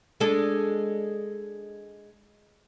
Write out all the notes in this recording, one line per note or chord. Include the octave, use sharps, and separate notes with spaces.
G#3 D4 A4